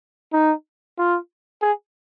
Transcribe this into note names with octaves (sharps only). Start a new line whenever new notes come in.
D#4
F4
G#4